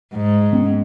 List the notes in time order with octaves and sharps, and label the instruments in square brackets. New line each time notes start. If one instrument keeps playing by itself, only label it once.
[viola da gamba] G#2
[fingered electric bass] B3 C#4